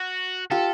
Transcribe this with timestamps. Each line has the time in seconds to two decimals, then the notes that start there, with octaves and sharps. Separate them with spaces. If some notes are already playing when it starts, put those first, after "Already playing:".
Already playing: F#4
0.51 F4 G4 A4